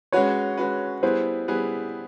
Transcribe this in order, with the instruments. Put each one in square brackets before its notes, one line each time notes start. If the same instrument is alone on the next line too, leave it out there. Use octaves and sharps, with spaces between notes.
[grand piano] G#3 C#4 F#4 B4 [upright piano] C#5
[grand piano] G#3 C#4 F#4 B4
[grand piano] G3 B3 E4 G#4 B4 [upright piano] C5
[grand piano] G3 B3 E4 G#4 B4